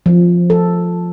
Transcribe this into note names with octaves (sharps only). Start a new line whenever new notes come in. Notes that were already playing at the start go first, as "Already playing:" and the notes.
F3
A4